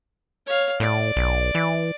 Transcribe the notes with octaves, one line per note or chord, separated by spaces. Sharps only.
C#5 F5
A2 D5
B1
E3